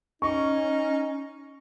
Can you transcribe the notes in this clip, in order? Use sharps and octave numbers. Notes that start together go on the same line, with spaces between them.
C#4 D#4 C#6